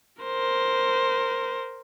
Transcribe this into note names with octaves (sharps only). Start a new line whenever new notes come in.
A#4 C5